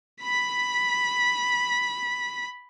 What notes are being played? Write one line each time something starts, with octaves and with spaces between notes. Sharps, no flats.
B5 B6